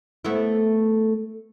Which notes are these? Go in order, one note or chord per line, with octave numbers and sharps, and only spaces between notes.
A3 B3 E4